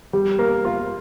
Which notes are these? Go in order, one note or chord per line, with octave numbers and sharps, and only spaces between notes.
G3
A#3
F4